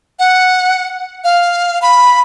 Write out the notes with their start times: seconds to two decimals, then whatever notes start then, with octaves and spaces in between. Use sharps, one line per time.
0.19 F#5
1.24 F5
1.82 B5